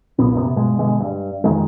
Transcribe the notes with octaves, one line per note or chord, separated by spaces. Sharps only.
B1 A#2 B3
F#2 C3 G#3 B3
G2 B2 G#3
B2 D3 G#3
G2
F2 D#3 G#3